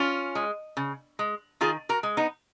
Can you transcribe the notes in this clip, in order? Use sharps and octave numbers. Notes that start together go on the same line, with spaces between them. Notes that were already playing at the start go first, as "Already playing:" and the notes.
Already playing: C#4 F4
G#3
C#3
G#3
D#3 F4 G#4
F#4 A#4
G#3
B3 D#4